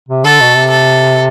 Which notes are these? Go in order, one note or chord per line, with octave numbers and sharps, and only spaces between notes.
C3
D3 A4
B2
C3
A4